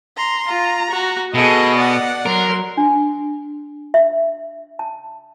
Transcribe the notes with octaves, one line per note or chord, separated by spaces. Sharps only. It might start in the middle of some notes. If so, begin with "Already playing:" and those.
A#5 C6
F4 A#5
F#4
B2 G#4 A4 D#5
D5 F#5
F#3 A#4 C6
D4
E5
A5